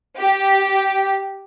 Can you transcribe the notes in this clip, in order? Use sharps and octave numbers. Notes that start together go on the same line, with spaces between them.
G4